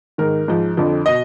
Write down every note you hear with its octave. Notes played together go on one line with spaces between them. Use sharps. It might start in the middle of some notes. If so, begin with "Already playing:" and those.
G#2 D#3 A#4
G#2 F3
F2 D3 F3
B2 D#5